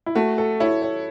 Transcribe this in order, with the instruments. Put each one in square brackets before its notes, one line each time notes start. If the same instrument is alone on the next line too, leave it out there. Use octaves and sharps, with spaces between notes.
[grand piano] E4
[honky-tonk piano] A3 [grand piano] F#4
[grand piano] A4
[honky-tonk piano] E4 [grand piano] C#5
[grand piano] C#5